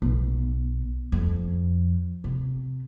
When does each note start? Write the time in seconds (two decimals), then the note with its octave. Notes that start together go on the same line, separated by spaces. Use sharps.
0.02 B1
1.12 F2
2.24 C3